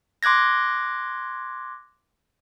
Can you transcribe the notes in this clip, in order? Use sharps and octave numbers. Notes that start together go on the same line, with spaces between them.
C6 D6 F#6 G#6 A#6